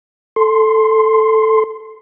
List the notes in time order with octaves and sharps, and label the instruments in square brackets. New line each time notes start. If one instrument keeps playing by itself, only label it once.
[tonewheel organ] A4 C6